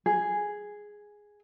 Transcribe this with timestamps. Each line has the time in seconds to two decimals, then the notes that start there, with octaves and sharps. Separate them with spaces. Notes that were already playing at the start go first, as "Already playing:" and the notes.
0.06 G#4